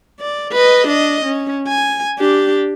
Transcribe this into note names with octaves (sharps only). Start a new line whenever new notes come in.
D5
B4 D#5
D4 D#5
C#4
G#5
D4 G4